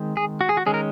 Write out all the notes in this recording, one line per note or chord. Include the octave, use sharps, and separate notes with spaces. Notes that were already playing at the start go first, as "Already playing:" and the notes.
Already playing: D#3 G#3 C4
G#4
F#4
G#4
F#4
D#3 G#3 C#4 G#4
A#4